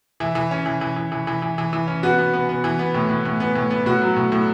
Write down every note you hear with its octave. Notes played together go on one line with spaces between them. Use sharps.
E3 E4
E3
C#4
E3
E3
E3
E3
E3
E3
E3
E3
C#4
B3 F#4
B3
B3
B3
E3
B3
A2
A2
A2
B3
A2
B3
A2 F#4
F#3
A2
A2